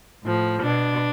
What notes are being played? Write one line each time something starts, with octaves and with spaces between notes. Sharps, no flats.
A2 F3
B2 D4